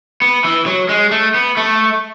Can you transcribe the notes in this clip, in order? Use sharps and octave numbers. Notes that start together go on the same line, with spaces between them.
B3
E3
F#3
G#3
A3
B3
A3